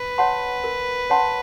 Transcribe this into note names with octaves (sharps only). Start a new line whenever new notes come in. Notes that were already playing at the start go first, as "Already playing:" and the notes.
Already playing: B4
C#5 F#5 A5 C6
A#4
C#5 F#5 A5 C6